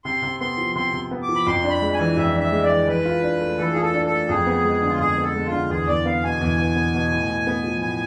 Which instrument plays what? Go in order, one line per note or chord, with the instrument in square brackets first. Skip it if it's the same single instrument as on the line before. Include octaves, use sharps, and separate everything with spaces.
[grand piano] C3 [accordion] C6
[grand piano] C3
[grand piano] B3 [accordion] C6
[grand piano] F3
[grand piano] C3 [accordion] C6
[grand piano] C3
B3
[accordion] D6
[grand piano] F3
[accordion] B5
[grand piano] F2 [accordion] C6
[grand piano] D4
[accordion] B5
[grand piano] G#3
[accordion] G#5
[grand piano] E3
[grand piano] F2 [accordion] E5
[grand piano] D4
[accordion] E5
[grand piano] G#3
[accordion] D5
[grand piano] E3
[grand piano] E3 [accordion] B4
[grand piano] F4
D4
A3
[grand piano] E3 [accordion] A4
[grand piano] F4 [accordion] G#4
[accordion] A4
[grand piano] D4
[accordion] A4
[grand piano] A3
[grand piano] F2 [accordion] G#4
[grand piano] B3
G#3
D3
[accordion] F4
[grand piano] F2 [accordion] G#4
[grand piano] B3 [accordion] A4
[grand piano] G#3
[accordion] F4
[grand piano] D3
[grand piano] E2 [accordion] G#4
[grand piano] E2 [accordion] D5
[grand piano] B3 [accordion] F5
[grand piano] B2 [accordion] G#5
[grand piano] E2
E2
B3
B2
A2
A2
B3
F3
[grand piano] A2 [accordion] G#5